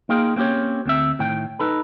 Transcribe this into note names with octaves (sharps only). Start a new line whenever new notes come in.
A#3 D#4 F4 G#4 G5
A#3 C4 C#4 G4 C#5
D2 C4 E5
A2 D#3 G5
D#4 A4 B4